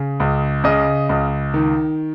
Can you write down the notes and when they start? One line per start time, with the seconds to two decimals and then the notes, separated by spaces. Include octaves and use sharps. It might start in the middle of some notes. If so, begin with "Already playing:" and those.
Already playing: C#3
0.20 C#2
0.64 C#3 D#5
1.09 C#2
1.54 D#3